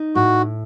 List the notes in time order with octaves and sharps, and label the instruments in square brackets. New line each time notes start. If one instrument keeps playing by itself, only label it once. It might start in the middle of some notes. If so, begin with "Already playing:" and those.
Already playing: [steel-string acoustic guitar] D#4
[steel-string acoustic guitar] A2 [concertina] F#4